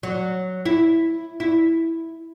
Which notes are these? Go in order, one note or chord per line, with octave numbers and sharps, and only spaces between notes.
F#3
E4
E4